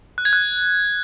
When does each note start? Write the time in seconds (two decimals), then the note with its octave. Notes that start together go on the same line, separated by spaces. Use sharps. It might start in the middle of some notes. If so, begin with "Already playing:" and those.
0.18 F#6
0.25 G#6
0.33 F#6